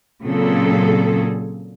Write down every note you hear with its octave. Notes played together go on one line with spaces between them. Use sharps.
A#2 C#3 F#3 C4 G#4 A4